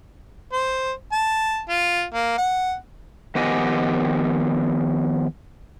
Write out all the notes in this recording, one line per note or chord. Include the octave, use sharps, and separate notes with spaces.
C5
A5
F4
A#3
F#5
D#3 F3 B3 G4 D#5 G#5